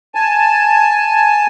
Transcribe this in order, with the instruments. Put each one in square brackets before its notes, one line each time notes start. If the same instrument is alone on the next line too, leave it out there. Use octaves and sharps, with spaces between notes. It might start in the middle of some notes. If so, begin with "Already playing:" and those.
[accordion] G#5 A5